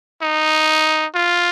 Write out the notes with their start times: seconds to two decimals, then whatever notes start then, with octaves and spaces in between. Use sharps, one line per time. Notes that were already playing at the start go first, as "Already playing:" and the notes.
0.22 D#4
1.15 F4